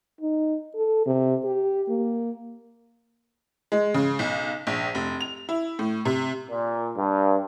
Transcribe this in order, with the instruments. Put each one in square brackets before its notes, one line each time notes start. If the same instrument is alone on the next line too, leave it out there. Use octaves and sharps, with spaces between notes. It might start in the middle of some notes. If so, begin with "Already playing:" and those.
[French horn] D#4
A4
C3
G4
A#3
[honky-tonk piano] G#3
C#3
B1
A#1
F1
F7
E4
A2
C3
[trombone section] A#2
G2